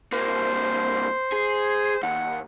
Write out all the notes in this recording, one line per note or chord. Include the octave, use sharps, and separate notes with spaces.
C2 A#3 C5
G#4
D#2 F#5